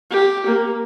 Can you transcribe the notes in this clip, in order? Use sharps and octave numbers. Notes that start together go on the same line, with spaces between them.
G4
A#3